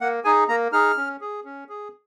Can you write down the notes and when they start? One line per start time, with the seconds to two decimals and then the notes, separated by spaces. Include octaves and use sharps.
0.01 A#3 F#5
0.25 D#4 G#4 G#5
0.48 A#3 A#5
0.72 D#4 G#4 F6
0.97 C#4
1.21 G#4
1.45 C#4
1.69 G#4